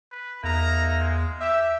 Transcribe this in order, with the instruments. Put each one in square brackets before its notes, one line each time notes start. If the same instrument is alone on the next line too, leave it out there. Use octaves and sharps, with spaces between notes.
[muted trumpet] B4
[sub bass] E2 [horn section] A3 A#3 D#4 [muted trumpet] A#5
[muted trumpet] G#3
[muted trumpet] G4 [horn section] E5